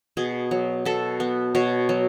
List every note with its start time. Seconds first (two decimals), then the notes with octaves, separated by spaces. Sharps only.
0.17 B2 G#4
0.51 F#3
0.85 B2 A4
1.20 B3
1.55 B2 C#5
1.89 F#3